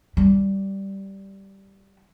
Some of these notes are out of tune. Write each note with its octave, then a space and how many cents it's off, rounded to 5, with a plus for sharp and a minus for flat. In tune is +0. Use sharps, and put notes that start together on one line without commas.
G3 -5